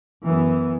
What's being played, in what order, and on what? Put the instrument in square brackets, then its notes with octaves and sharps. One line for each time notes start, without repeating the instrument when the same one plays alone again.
[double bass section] F#2 E3 B3